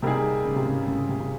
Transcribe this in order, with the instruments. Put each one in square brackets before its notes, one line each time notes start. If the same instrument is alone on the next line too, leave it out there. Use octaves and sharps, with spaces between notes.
[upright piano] C3 [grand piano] G3 A#3 D#4 G#4
[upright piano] C#3
C3
C#3
C#3
C3
C#3